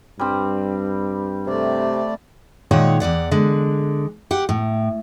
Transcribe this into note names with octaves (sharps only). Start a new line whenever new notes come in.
G2 G3 C4
C3 A3 D5
A#2 D#3 G#3 C#5 F#5
E2 D#3 D5 F#5
D3 G#3
G4 F#5
A2